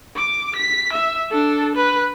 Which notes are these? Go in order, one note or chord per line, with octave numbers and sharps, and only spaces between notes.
D6
B6
E5
D4 A4
B4